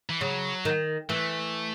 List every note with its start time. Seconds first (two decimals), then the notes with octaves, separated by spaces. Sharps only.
0.09 E3
0.21 C#3 F#3
0.65 D#3
1.09 E3 A3